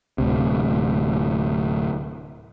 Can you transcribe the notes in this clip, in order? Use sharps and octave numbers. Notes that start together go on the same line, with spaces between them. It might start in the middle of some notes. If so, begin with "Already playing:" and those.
D1 G#1 D2 C3